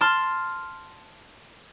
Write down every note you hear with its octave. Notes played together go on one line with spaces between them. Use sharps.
A5 C6 F6